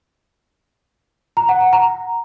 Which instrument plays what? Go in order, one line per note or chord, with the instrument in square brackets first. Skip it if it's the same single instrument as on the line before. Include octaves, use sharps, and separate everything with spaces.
[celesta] A#5
F#5
F#5
A#5